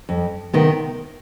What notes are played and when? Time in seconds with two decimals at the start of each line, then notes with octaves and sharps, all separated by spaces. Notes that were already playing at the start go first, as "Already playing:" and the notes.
0.09 F2
0.53 C3 D#3 B3